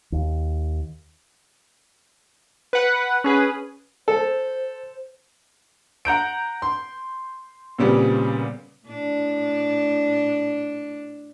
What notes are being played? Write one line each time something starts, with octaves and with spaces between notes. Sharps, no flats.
D#2
B4 F#5
C#4 G#4 B4
A4 C5
F#5 A#5 G6 D7
C6
A#2 C#3 G3 B3 C4
A2 D4